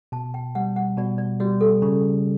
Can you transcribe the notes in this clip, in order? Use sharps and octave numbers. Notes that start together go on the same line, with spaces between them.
B2 A5
G5
G3 F#5
F#5
B2 D5
D5
G3 F#4
A4
C#3